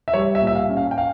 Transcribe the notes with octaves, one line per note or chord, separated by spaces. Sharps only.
E5
G3 C#5
E5
A#2
E5
F5
C#4
F5
G5
F5